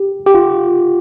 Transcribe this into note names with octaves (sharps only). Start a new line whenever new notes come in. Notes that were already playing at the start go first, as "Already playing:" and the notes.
Already playing: G4
G4
F4